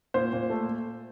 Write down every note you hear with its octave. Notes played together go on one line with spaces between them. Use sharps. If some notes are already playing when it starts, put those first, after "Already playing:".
A#2 C5
A#2
A3